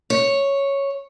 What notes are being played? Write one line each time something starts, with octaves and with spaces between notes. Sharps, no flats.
C#5